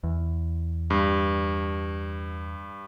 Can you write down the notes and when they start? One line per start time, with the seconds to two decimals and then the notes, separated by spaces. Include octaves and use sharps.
0.04 E2
0.90 G2